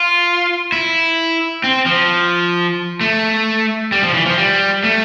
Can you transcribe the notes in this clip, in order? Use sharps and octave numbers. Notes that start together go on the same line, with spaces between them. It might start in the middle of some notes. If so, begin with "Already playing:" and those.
Already playing: F4
E4
C4
F3
A3
G3
F3
E3
F3
G3
A3